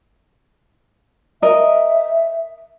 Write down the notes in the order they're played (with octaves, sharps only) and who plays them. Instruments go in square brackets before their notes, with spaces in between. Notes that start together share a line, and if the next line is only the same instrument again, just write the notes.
[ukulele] A#4 D#5 [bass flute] E5